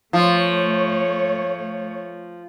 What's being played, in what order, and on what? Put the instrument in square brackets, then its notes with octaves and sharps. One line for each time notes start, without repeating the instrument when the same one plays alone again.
[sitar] F3 [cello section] A3 C#5